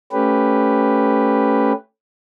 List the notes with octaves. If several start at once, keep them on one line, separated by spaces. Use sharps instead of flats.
A3 C#4 G4 B4